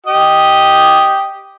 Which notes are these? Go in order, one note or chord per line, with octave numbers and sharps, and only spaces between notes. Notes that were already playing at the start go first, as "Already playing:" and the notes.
G4 D#5